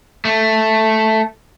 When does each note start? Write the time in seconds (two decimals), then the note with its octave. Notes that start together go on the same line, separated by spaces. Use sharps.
0.25 A3